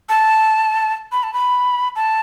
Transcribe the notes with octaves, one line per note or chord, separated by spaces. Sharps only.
A5
B5
A5
B5
A5